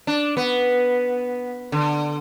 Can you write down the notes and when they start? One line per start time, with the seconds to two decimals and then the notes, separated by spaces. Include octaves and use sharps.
0.07 D4
0.37 B3
1.72 D3